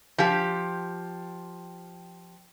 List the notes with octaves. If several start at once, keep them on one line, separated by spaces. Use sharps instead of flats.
F3 G4